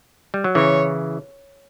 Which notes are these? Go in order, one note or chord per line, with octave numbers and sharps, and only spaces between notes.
G3
F#3
C#3 E3 C#5